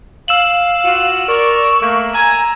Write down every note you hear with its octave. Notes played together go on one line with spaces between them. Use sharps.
F5 E6 E7 F#7
F4 F#4
A#4 D5 C#6
A3 A#3
G#5 A#5